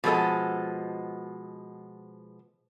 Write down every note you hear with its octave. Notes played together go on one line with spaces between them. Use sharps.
B2 F3 G#3 C4 A4 D#5